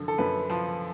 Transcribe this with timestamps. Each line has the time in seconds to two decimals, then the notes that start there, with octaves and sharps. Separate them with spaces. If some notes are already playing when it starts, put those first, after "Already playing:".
Already playing: F#2 D3 F3
0.08 A4
0.18 F#2 B4
0.50 F3